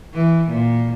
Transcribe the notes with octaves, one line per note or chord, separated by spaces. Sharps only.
E3
A#2